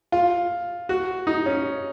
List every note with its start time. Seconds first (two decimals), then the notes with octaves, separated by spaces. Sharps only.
0.12 F4
0.89 F#4
1.27 D#4
1.46 C#4